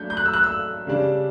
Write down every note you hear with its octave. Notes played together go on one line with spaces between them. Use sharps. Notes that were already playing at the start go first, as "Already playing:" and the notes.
Already playing: F#3 A3 D4 G6
G6
F#6
E6
F#6
E6
C#3 G3 D4